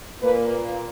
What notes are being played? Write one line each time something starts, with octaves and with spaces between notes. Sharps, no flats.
A#2 A#3 B4